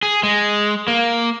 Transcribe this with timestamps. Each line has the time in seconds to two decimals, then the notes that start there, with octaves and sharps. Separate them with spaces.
0.03 G#4
0.23 G#3
0.88 A#3